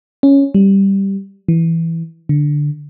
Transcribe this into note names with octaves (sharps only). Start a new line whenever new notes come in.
C#4
G3
E3
D3